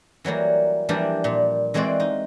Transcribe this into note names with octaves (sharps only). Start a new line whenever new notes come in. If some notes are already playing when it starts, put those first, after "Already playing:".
E3 F#3 G3 A#3
E3 F3 G3 A#3 D4
A#2
E3 G#3 C4 F#4 D5
D#4